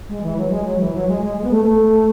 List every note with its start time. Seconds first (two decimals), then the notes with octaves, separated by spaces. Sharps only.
0.09 G#3
0.23 E3
0.37 F#3
0.50 G#3
0.65 F#3
0.80 E3
0.94 F#3
1.08 G#3
1.22 G#3
1.37 G#3
1.44 B3
1.51 A3
1.65 A3